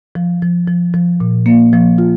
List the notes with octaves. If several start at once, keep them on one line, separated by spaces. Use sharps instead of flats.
F3
F3
F3
F3
A#2
A#3
F3
F4